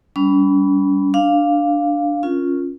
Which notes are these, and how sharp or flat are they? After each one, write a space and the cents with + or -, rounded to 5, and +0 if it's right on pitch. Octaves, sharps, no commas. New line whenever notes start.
G3 +0 C#4 +45 B5 +0
D4 +0 F5 +0
C#4 +0 F4 +0 A#4 +0